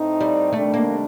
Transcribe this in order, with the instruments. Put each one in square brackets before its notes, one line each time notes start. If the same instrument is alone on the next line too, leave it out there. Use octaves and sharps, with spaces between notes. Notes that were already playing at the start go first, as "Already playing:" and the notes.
Already playing: [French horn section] A2 A3 C4 D#4
[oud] G3
[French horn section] C3 D#3 G3 D4 [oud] A3
[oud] A#3